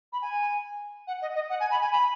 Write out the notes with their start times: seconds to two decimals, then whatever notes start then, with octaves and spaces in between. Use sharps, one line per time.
0.13 B5
0.22 G#5
1.08 F#5
1.22 D#5
1.35 D#5
1.50 F#5
1.60 G#5
1.71 B5
1.81 G#5
1.92 B5